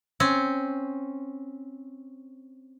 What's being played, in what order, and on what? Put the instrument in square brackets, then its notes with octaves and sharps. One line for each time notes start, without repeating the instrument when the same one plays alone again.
[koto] C4 C#4